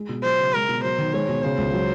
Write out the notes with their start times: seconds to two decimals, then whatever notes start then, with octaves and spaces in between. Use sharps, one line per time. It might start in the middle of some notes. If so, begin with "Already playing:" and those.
Already playing: G#3
0.09 B2
0.23 F#3 C5
0.39 C#3
0.54 G#3 A#4
0.69 B2
0.83 F#3 C5
0.98 D#3
1.14 G#3 C#5
1.29 B2
1.43 C#3 C5
1.58 C#2
1.74 F#3